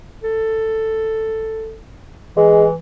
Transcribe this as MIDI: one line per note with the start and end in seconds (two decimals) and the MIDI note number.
0.24 1.76 69
2.37 2.76 52
2.37 2.65 56